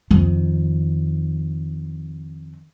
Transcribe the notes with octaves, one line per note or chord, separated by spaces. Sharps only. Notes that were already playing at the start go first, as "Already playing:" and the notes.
F2 D#3